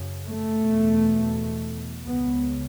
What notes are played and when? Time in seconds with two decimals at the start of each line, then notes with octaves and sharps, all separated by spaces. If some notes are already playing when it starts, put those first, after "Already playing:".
Already playing: F#2 C#3
0.26 A3
0.61 E2 B2
2.06 C#2 C#3 B3